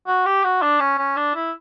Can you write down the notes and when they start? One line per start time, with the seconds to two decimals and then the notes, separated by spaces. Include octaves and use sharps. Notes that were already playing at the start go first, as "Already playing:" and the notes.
0.07 F#4
0.25 G4
0.44 F#4
0.62 D4
0.80 C#4
0.98 C#4
1.16 D4
1.35 E4